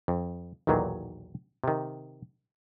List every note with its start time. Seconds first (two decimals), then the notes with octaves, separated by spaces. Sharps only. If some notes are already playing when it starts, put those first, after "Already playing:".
0.08 F2
0.67 B1 E2 A#2 D#3 F#3
1.64 C3 D#3